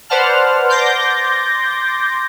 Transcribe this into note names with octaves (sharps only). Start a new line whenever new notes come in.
B4 C5 D5 F#5 A5 F6
C6 D6 G6 A6 A#6